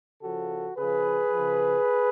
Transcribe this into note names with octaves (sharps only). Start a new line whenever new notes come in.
C#3 F3 F#4 A4
C#3 F3 G#4 B4
C#3 F3